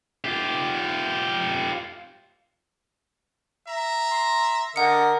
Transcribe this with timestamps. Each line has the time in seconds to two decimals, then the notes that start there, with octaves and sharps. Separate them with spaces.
0.24 F4 G4
3.68 E5 A#5
4.11 C6
4.76 D3 A#4 D#5 F#5 C#7